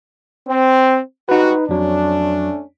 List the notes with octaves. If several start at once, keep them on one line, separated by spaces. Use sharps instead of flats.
C4
G#2 G3 D#4 F#4 B4
F2 F#3 A3 C#4 D4